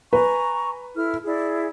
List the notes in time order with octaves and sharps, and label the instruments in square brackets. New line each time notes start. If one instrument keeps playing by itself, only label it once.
[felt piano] B4 [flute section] G#5 A#5 C#6
[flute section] E4 A4 F6
E4 G#4 D5